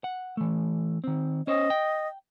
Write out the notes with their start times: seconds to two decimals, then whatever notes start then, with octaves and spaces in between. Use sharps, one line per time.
0.04 F#5
0.37 E3 A3
1.04 D#3 C4
1.47 C#4 C5 C#5 D#5
1.70 G5